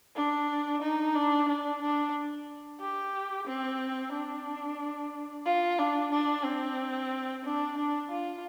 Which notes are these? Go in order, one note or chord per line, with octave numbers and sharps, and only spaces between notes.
D4
D#4
D4
D4
D4
G4
C4
D4
F4
D4
D4
C4
D4
D4
F4